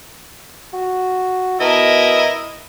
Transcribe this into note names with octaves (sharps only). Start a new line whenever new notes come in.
F#4
B2 E4 A#4 D#5